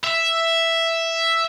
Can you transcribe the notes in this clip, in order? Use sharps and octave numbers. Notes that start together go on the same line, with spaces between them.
E5